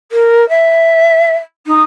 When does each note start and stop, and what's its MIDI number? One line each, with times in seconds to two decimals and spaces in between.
0.12 0.48 70
0.49 1.34 76
1.66 1.83 63